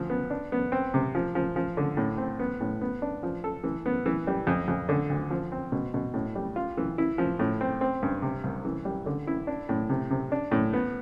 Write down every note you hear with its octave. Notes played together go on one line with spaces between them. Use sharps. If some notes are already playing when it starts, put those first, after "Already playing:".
Already playing: D2 F3
B3
D4
B3
C4
C3
F3
F3
F3
D3
A2
C4
B3
A2
B3
D4
F3
A4
E3
B3
E3
G3
F2
F2
D3
D2
F3
C4
B2
B2
A2
G3
F4
E3
E4
F3
A2
C4
C4
G2
C3
C2
E3
G3
D3
E4
D4
A2
C3
C3
D4
A2
B3